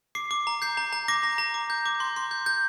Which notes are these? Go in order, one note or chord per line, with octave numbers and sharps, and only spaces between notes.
D6 C7
D6
A#5
G6 C7
A#5
A#5
D6 A#6
A#5
A#5
D6
G6
D6
C6
C6
G6
G6